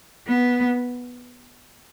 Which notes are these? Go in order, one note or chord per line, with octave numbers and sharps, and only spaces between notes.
B3